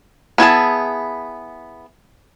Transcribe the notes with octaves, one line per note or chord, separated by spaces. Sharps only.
B3 E4 G#4 A5